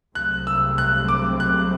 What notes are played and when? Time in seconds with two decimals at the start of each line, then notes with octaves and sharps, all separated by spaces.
0.15 C2 C3 F#3 A3 C4 F#6
0.47 E6
0.78 F#6
1.08 D6
1.40 F#6